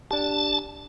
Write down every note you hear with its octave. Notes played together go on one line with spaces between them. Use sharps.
D4 G4 A5